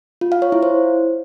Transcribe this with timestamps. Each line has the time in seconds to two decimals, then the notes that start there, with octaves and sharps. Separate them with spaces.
0.21 F4
0.32 F5
0.42 C#5
0.52 E4
0.63 C5